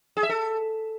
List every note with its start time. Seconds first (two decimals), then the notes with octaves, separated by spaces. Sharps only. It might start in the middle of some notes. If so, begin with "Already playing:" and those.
0.17 G#4
0.23 E5
0.29 A4